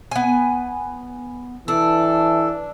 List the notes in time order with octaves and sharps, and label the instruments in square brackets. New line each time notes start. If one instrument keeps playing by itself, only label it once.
[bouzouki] B3 G#5
[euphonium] E3 [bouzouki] D4 [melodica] A4